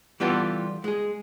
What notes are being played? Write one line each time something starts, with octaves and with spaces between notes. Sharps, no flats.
E3 G3 B3 F4 G4 A4
G#3 G#4